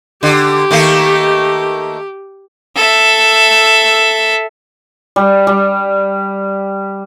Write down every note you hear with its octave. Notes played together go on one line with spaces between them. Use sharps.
D3 G4
D#3 A3 A#3
A4 E5
G3
G3